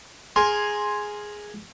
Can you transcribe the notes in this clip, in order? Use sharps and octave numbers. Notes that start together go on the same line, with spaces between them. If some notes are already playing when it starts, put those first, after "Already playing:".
G#4 A#4 G#5 C6